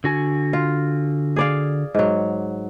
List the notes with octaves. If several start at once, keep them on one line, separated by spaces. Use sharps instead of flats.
D3 F#4 G#5
F4
G#4 D5 F5
G#2 F#3